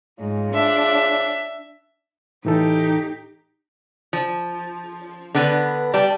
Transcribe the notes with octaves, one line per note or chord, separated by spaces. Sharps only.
G#2 F4 G#4 C#5
D4 E5
A2 E3 D#4 G4 A4
F3
D3 B3 B4
G3 A5